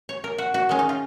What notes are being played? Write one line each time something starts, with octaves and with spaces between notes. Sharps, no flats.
C#5
A#4
F#4
F#4
D#3 G#3 C#4
D#4
F4